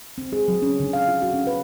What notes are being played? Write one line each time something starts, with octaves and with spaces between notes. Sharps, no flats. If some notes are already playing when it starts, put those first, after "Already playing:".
C4
G#4
F#3
C#4
D3
F5
F4
F#4
C#4
B4